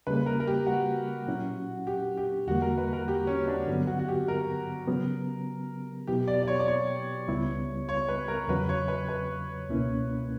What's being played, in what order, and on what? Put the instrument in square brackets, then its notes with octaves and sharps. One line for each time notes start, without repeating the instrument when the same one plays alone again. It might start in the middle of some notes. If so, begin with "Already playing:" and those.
[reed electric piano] C#3 G3 A#3 [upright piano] B4
[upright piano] A#4
A#4
G4
F#4
[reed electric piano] A#2 F#3 C#4 E4
[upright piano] G4
G4
[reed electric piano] E2 D3 G3 A#3 [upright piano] F#4
[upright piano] A#4
B4
A#4
G4
C#4
D4
[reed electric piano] G2 D3 F#3 B3
[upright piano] F#4
F#4
G4
A#4
[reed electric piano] C#3 F#3 B3
[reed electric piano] B2 F#3 B3 E4 [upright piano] G4
[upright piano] D5
D5
C#5
D5
C#5
[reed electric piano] C#2 C#3 G3 B3 E4
[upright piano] C#5
B4
A#4
[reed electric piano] E2 C#3 F#3 [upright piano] B4
[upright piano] C#5
B4
B4
[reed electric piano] C#2 B2 A#3 C#4 E4